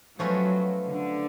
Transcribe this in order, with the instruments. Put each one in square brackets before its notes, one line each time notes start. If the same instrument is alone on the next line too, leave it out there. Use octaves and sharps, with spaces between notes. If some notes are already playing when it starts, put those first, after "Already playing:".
[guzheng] F3 A3 C#4 F#4 B4 [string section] F#3
[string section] D3